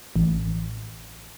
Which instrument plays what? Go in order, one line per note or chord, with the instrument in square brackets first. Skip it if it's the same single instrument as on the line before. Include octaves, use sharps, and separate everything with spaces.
[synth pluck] A1